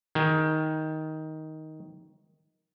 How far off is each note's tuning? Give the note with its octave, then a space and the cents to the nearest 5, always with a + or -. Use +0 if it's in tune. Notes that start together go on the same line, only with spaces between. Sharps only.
D#3 +10 G#4 +0